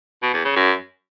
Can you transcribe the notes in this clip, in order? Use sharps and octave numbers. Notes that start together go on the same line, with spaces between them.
B2
E2
C#3
F#2